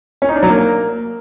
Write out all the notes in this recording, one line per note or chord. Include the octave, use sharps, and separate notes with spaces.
C#4
D#4
D4
F#3
A#3